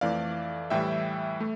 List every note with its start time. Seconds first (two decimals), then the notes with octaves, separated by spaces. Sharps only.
0.01 F2 E3 A3 D5 F5
0.70 A2 E3 G3 E5 G5
1.41 A3